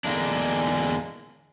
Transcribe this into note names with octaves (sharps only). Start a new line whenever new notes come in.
E2 D3 G#3 A#3 D4